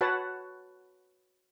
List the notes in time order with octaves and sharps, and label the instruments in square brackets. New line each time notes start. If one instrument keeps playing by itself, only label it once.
[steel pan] F#4 B4 C#5 F#5 A5